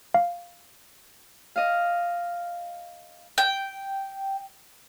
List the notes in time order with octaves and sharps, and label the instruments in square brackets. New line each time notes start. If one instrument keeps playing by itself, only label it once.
[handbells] F5
[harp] D#5 F5
[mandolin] G5